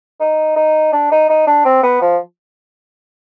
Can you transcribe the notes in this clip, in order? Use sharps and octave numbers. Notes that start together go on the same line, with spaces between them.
D#4
D#4
D4
D#4
D#4
D4
C4
B3
F3